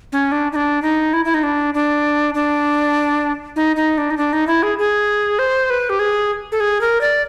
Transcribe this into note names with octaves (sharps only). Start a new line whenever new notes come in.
C#4
D4
D#4
D4
D#4
E4
E4
D#4
D4
D4
D4
D#4
D#4
D4
D#4
D4
D#4
E4
G#4
G#4
C5
B4
G4
G#4
A4
G#4
A#4
D5